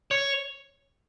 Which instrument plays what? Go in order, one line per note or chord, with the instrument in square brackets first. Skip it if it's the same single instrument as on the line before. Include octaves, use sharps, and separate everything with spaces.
[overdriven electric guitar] C#5